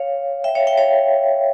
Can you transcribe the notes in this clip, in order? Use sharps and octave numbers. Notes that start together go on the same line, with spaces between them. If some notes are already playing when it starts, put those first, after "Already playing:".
Already playing: C#5 F5
E5 G5
C#5 F5
E5 G5
C#5 F5